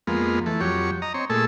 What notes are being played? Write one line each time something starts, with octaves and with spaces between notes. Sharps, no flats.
F2 G#3 A#3 B3 F4
E3 A3
F2 F#3 G4 C#5
D#5 A#5
C4 C#5
A#2 A3 G#4 A4 E6